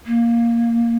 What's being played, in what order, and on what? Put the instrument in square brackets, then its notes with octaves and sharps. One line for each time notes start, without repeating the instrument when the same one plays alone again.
[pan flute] A#3